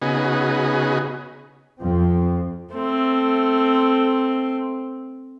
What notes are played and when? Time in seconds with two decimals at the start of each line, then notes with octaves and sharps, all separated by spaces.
0.02 C#3 B3 D#4 F#4 G#4
1.81 F2 F3 C4
2.73 A3 C4